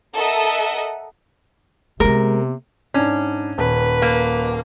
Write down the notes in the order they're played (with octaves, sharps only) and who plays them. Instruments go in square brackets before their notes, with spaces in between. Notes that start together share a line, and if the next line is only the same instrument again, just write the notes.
[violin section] A4 A#4 D#5 E5 F#5
[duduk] C3 [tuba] G#3 [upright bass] A#3 B3 [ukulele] A#4
[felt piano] G#2 D4 [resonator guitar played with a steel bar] C#4
[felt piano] D#1 [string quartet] B4
[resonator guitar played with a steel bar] A#3